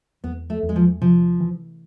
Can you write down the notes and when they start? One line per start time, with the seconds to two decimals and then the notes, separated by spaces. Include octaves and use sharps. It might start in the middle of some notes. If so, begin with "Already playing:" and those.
0.24 E2 B3
0.50 A3
0.63 E2
0.69 G#3
0.76 F3
1.01 C3 F3
1.40 E3